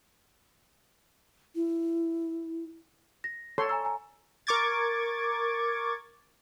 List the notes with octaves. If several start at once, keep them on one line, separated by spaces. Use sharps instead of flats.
E4
A#6
A4 C#5 C6
G#5 A#5 E6
G#5 A#5
A#4 C#6 D6 G#6 A6